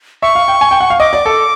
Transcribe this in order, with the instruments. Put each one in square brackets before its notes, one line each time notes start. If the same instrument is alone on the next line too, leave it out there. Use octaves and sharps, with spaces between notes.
[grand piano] E5 [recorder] C#6
[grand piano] F5
G5
G#5
G5
F#5
F5
[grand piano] D#5 [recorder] D6
[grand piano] D5
A4